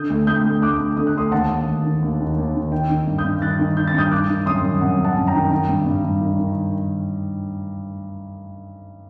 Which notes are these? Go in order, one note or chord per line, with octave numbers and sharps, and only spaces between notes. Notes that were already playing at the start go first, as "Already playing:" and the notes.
Already playing: D3 D#6 G6
D2
D2 D#6 G6
D2
D3 D6 F#6
D3
D3 D#6
F#6
D2 C6 D#6
D#2 F#5 A5
D#2
D#2
D#3
D#2
D#3
D#2
D#3
D#3 G5
D#3
G2
D#6 G6
G2
D#3 F#6 A6
D#3
D#3 G6
A6
G2 D#6 G6
D#3 D6 F#6
D#3
F#2 C6 D#6
F#2
F#2 F#5
F#2
F#5 A5
F#2
G5 A#5
D#3
D#3 G5 A#5
G2
G2
G2
D#3
D#3